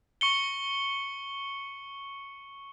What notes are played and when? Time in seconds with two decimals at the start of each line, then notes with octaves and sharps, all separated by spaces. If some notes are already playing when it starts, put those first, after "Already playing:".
0.21 C#6 C#7 G7